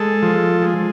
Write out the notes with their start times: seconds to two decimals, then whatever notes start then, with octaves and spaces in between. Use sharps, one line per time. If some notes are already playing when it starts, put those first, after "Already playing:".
Already playing: G#3 A4
0.23 F3
0.62 G#3